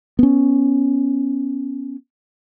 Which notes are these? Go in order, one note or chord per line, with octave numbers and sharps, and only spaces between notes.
B3 C#4